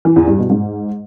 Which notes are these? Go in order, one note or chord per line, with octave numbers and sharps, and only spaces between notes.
E3
E2
G2
B2
G#2